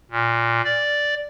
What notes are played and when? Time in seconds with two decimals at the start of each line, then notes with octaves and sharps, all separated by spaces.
0.11 A#2
0.64 D5